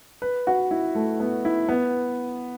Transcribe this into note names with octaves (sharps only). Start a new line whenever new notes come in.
B4
F#4
E4
A3
B3
E4
B3